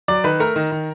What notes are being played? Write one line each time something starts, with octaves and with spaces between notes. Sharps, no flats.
F#3 D5 D6
D#3 B4 B5
A3 A#4 A#5
D#3
D#3